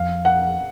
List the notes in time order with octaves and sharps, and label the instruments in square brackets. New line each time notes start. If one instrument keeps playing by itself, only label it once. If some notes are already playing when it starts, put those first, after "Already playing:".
Already playing: [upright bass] F2 [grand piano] F5
[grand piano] F#5